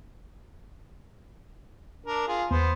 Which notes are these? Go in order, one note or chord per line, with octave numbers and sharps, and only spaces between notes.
D4 A#4
F4 G#4
E2 B3 C5